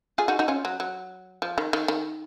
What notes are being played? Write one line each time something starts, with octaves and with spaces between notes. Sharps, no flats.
F4 G#4
D#4 F#4
D#4 F#4
C#4 F4
F#3
F#3
F3
D#3
D#3
D#3